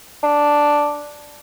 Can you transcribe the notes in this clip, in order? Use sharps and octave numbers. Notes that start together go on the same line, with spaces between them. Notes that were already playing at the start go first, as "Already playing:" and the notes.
D4